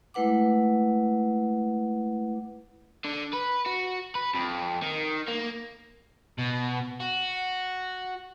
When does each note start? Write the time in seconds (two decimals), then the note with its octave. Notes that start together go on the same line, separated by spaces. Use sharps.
0.14 G#3 A3 E4 B4 F#5 D6
3.05 D3
3.33 B4
3.66 F#4
4.15 B4
4.34 F2
4.82 D#3
5.28 A#3
6.39 B2
7.00 F#4